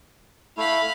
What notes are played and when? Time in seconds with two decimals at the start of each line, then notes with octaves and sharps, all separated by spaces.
0.57 A3 E4 F5 B5